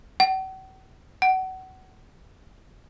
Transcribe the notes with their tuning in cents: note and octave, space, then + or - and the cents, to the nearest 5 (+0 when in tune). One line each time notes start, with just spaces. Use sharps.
F#5 +45
F#5 +25